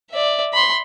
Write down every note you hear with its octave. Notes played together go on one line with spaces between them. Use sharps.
D5 E5
B5 C6